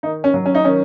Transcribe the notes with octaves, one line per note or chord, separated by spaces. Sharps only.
D#3 D#4
C#4
F#3
C#4
D#4
D#3 C#4